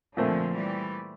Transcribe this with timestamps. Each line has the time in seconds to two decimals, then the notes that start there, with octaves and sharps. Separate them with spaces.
0.17 A#2 D3 F3 A3 C4
0.53 E3 G3